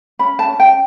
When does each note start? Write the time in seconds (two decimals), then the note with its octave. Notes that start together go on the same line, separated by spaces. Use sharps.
0.19 C#4 B5
0.39 A5
0.49 C#4
0.60 G5